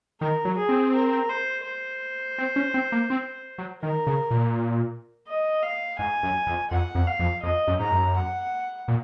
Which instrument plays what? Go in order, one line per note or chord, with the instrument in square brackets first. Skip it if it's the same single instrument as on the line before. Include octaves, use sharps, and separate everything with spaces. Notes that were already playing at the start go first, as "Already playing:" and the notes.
[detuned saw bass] D#3 [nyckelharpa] A#4
[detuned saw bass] F#3
[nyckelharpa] G#4
[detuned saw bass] C4
[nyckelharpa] A#4
C5
C5
[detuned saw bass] C4
C#4
C4
A#3
C4
F#3
[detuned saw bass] D#3 [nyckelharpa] A#4
[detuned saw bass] C#3
A#2
[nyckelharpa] D#5
F5
[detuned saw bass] G#2 [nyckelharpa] G#5
[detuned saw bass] F#2
F2
[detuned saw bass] F2 [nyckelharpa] F#5
[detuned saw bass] F2
[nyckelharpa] F5
[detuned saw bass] F2
[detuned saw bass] F2 [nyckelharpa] D#5
[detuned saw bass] F#2
[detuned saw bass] G#2 [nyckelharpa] A#5
[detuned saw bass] F#2
[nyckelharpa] F#5
[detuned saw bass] A#2